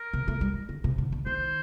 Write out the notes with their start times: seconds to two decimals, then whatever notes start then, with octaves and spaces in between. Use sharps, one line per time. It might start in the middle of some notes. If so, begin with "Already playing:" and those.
Already playing: A#4
0.13 C3
0.28 A3
0.41 G3
0.69 D3
0.84 C3
0.98 D3
1.12 D3
1.26 D#3 C5